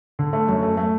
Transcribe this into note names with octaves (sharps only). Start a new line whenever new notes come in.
D3
A3
F#2
A3
A3